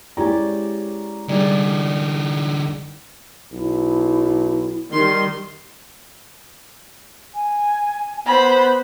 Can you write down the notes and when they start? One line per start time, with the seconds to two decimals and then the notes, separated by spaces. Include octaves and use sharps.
0.17 G#3 C#4 E4 G4 D5 A#5
1.29 D3 G3 D#4 G#4 D5
3.52 B1 E4
4.92 D#3 G3 C6
7.35 G#5
8.26 B3 C5 B5